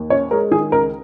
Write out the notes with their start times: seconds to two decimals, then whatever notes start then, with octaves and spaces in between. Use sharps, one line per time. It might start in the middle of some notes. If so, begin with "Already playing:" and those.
Already playing: D#2
0.10 C#4 C#5
0.31 G#3 A#4
0.51 D#3 G#4
0.72 C#2 A#4